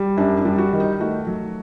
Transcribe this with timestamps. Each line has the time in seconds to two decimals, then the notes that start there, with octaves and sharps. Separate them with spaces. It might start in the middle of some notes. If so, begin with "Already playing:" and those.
Already playing: G3
0.17 F#2 D4
0.38 D4
0.45 G3
0.58 F#4
0.73 D#3
0.80 D#4
1.00 A3 F#4
1.27 F#3